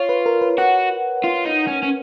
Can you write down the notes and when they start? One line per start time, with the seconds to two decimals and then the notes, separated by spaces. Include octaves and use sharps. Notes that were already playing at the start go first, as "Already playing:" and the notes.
Already playing: F4 C#5
0.09 B4
0.26 A#4
0.41 B4
0.58 F#4 F#5
1.24 F4
1.45 D#4
1.67 C#4
1.82 C#4